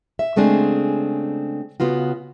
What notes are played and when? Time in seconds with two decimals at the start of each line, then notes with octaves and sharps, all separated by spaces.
0.19 E5
0.36 C#3 G#3 A3 C4 D4 G#4
1.80 C#3 B3 F4 F#4